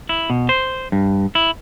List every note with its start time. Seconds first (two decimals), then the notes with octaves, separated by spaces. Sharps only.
0.09 E4
0.30 B2
0.49 C5
0.92 G2
1.35 E4